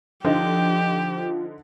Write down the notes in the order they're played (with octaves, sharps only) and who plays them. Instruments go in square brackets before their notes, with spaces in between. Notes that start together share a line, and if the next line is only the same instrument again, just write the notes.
[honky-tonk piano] D3 D#4 [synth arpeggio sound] F3 [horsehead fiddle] G4